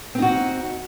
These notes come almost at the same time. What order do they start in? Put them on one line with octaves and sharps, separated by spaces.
C4 D#4 F#4